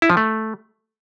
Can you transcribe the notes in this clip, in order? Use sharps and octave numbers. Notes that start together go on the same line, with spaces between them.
E4
F3
A3